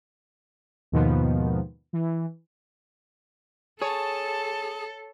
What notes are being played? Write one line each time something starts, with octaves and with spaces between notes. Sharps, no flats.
D#2 G#2 B2 D#3 F3 B3
E3
G#4 A4 C#5 A5